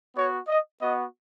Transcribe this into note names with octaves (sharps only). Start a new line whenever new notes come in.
B3 F#4 C#5
D#5
B3 F#4 D#5